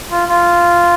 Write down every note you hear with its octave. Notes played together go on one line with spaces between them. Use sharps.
F4
F4